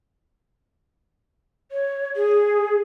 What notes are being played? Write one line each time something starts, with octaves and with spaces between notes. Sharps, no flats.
C#5
G#4